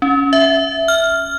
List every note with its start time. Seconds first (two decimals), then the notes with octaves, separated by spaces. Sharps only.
0.02 C#4
0.33 E5
0.88 F6